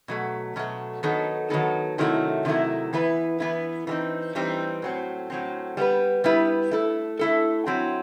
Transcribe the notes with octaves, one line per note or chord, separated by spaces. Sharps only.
B2 F#3 A3
B2 F#3 A3
D#3 F#3 B3 D#4 A4
D#3 F#3 B3 D#4 A4
C3 D#3 F#3 A3 E4
C3 D#3 F#3 A3 E4
E3 B3 E4 B4
E3 B3 E4 B4
E3 G3 C4 D#4
E3 G3 C4 D#4
A2 F#3 C4
A2 F#3 C4
G3 B3 E4 B4
G3 B3 E4 B4
A3 E4 A4
A3 E4 A4
F#3 C4 E4